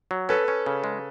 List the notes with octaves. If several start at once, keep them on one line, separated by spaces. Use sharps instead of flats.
F#3
C#4 A4 B4
C#4
C#3
G#3